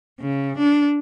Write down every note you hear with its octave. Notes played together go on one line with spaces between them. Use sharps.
C#3
D4